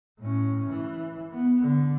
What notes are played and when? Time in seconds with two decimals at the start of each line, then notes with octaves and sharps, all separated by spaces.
0.20 A2 C#4
0.70 E3
1.32 B3
1.63 D3